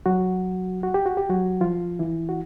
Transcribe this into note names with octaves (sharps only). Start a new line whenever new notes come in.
F#3 F#4
F#4
G4
F#4
G4
F#3 F#4
F3 F4
E3 E4
F#4